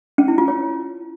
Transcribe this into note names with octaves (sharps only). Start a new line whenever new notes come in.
C#4
E4
F4
C#5